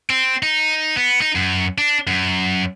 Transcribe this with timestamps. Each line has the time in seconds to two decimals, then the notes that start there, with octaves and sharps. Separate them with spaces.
0.10 C4
0.43 D#4
0.97 B3
1.21 D#4
1.35 F#2
1.78 D4
2.07 F#2